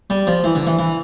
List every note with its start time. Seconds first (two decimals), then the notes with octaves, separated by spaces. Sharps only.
0.10 G3
0.27 F3
0.44 E3
0.55 D3
0.67 E3
0.79 E3